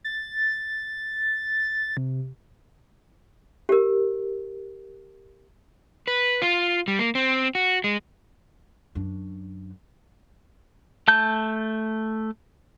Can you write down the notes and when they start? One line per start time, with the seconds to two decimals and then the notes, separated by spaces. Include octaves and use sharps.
0.04 A6
1.97 C3
3.69 G4 A#4
6.08 B4
6.42 F4
6.88 G3
6.99 A#3
7.15 C4
7.55 F#4
7.84 G#3
8.95 F#2 D4
11.08 A3 A5 G6